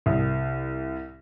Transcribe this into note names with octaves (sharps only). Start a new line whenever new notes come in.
C2